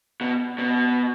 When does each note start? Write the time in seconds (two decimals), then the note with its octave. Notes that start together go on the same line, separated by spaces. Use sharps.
0.21 B2
0.58 B2